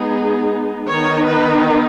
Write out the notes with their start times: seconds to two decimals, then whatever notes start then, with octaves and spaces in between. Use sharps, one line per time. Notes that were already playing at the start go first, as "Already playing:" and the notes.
Already playing: G#3 B3 D#4 G#4
0.87 D#3 B3 D#4 C#5
1.26 B4